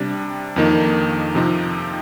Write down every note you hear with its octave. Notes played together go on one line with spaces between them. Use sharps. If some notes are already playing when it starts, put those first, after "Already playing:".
Already playing: C3 G3 D4
F2 D#3 A#3 D#4
C3 F3 C4 D#4